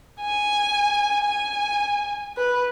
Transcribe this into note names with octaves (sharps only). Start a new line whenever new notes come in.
G#5
G#5
B4